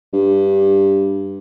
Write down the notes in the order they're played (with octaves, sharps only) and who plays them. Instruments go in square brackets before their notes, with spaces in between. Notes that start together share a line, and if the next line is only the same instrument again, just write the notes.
[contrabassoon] G2